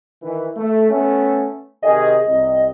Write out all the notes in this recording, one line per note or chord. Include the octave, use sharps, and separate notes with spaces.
D#3 E3
A3
A3 B3 C#4
C3 D#3 G#4 D#5
C2